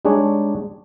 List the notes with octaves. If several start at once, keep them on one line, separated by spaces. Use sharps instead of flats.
G3 G#3 D4 D#4 G#4 C#5